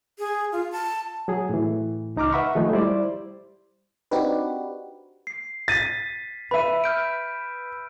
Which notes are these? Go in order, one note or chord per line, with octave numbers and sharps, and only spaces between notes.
G#4
F4
A5
F#3 G#4
A2 E3
C#2 D#4 A#5 D6 F6
B4 E5 F#5 B5 C#6
D#3 F3 G#3 A3 D#4
G3 E4 G4 C5 D5
C4 D4 D#4 F#4 G4 B4
C7
A6 B6 D#7
B4 E5 B5 D#7
F6 G6 D7